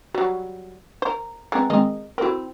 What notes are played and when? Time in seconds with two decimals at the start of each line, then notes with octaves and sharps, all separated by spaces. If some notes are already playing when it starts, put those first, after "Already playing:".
0.15 F#3 G3 F#4
1.02 A#4 C5 G6
1.52 G#3 B3 C4 A#4 A6
1.70 D#3 G#3 C4 G#4 A#4 D#5
2.18 C4 E4 F#4 A4 A#4